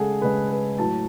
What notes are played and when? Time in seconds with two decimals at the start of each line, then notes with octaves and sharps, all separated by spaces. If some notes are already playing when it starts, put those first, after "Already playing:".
Already playing: C#3 G#3 G#4 A4 F#5
0.22 C#3 G#3 B4
0.50 B4
0.78 A2 F#3 A5